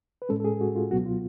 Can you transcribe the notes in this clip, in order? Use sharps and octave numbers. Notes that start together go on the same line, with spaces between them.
B4
A2 G#3 C#4 A4
A4
G#4
F#4
F4
C#2 B2 F#3 B3 F#4
F4